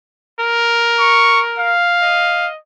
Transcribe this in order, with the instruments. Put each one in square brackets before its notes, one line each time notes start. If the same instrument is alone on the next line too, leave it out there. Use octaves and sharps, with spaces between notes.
[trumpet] A#4
[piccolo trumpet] C#6
F5
[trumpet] D#5